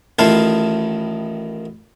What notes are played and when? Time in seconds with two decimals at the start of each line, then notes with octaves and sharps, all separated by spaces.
0.19 A1 D#3 E4 F4 F5 A5